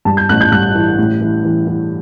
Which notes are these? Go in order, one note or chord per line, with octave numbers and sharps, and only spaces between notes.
G2 A5
G6
A1 F#6
G6
G2 F#6
E3
A2
E3
E3
E3